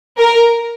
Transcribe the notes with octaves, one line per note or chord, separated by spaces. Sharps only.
A#4